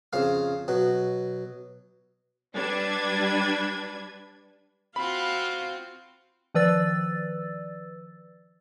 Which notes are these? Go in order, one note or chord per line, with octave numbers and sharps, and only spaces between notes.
F2 C#3 F5
B2 F#3
G3 D4 B4 G#6
C4 F4 F#4 F5 B5
D#3 F3 B4 D5 E6 A6